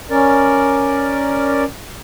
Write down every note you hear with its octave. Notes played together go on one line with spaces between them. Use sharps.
C#4 A#4 D5